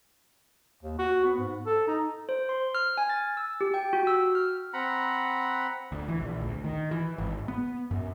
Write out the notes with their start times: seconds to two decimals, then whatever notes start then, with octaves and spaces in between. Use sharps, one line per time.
0.83 D#2
0.99 F#4
1.24 B3
1.38 G#2
1.66 A4
1.87 D#4
2.29 C5
2.49 C6
2.75 F6
2.98 G#5
3.10 A6
3.37 E6
3.61 G4
3.74 G5
3.93 F#4
4.07 E6
4.35 F6
4.73 C4 F#5 A#5 B5
5.92 D2
6.08 E3
6.20 A#1
6.42 D2
6.64 D#3
6.91 E3
7.18 G#1
7.48 B3
7.91 F#2